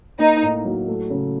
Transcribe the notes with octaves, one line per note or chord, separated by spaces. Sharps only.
A#3 D#4
A2
F#3
A3
C#3